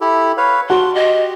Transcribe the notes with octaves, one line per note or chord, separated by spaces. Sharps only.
E4 G4 A4
B4 C#5 F5
F#4 F#5 A5 C6
G4 D#5